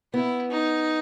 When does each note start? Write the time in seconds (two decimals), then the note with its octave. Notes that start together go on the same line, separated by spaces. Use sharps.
0.14 B3 E4
0.51 D#4